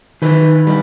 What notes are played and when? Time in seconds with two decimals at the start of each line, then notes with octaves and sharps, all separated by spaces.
0.22 D#3 B4
0.67 G3